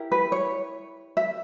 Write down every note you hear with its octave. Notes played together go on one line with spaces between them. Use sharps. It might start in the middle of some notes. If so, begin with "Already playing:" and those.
Already playing: E4 G4 A#4
B4
C#5
E5